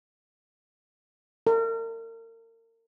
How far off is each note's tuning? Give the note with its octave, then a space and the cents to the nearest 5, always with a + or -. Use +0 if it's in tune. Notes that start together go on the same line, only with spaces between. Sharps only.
A#4 -35